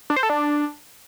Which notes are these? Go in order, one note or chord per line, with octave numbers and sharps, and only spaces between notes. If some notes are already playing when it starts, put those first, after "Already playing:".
D4
C5
A4
D4